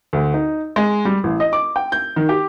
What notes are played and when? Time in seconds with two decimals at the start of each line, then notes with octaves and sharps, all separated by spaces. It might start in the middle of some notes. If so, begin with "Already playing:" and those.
0.13 D2
0.34 D#4
0.76 G#3
1.05 G3
1.24 A1
1.40 D#5
1.53 D6
1.76 G5
1.92 G6
2.16 D#3
2.29 G4